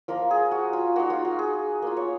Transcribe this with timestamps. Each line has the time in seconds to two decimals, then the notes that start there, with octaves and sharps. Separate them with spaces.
0.08 F3 A#3 F4 A#4
0.31 G#4
0.51 F#4
0.73 F4
0.96 A#3 D#4 F#4
1.10 F4
1.25 F#4
1.39 G#4
1.82 A#3 F4
1.97 C#5